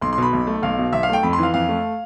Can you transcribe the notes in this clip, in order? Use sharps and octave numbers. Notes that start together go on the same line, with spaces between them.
B1 C6
C6
B2 B5
B1
A3
B1 F5
B2
B1 E5
F5
A3 G5
F2 B5
C6
E3
F5
F2 F5
A3